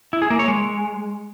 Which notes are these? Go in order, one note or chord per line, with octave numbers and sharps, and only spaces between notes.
E4
G#4
A#3
C#5
G#3